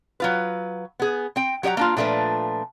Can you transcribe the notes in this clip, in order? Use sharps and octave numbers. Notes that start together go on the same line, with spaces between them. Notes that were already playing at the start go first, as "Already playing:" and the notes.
F#3 F4 B4
B3 G#4
C4 G5
F#3 G4 D5 F#5 A#5
A#3 D4 F4
A#2 F3 A3 D4 B4